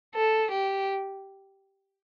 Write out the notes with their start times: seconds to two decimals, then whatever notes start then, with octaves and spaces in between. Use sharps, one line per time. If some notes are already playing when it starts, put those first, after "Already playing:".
0.15 A4
0.51 G4